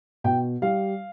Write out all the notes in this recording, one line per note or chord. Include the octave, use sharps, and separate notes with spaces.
B2 G5
G3 F5